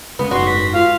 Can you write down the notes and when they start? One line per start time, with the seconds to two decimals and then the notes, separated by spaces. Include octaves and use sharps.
0.19 C#3 G#3 B3
0.31 F#1 G#2 F#4 C6
0.46 B6
0.73 F4 F5